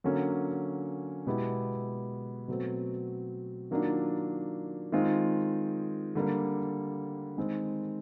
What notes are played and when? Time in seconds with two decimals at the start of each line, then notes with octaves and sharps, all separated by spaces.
0.04 D3 F#3 A#3 C#4
1.27 B2 G#3 B3 E4 G4
2.48 B2 F#3 A3 C4
3.71 D#3 F#3 A#3 D4 F4
4.92 D#3 G#3 C4 F4
6.15 D3 G3 A#3
7.37 D#3 G#3 C4